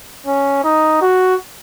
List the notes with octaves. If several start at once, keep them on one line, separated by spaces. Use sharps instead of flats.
C#4
D#4
F#4